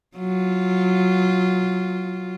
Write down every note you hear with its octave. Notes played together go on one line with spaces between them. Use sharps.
F#3 F4